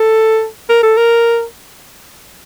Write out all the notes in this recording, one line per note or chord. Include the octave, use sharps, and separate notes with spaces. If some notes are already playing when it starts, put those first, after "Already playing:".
Already playing: A4
A#4
A4
A#4